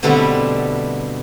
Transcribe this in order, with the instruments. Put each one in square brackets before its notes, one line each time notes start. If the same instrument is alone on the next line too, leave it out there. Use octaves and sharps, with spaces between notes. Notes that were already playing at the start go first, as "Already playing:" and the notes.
[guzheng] B2 D3 G3 A3 B3 C4